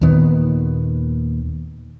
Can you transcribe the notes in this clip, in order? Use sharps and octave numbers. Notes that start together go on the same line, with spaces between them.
D#2 A#2 D#3 B3